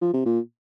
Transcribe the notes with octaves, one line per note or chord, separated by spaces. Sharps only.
F3
C3
A#2